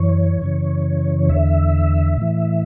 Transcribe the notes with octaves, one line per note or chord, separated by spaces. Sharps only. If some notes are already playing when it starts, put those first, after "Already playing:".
Already playing: F#2 E3 C#5
F#2 C#3 E3
E2 D3 E5
A2 E3